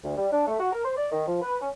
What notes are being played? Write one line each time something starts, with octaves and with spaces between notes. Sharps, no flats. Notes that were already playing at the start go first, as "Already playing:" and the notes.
D2
G3
D4
A3
F#4
A#4
C5
D5
D#3
F3
B4
C#4